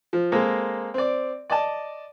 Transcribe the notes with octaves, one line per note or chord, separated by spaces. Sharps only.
F3
G#3 A#3 C4 A4
C4 D5
D5 D#5 A5